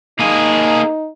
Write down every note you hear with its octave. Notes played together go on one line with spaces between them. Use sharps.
A#3 D#4 G#4